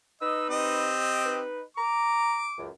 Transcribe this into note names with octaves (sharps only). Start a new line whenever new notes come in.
D#4 B4 D#5 E6
C4 G4 D#5
D#4 B4
A#5 D6
C#2 F#2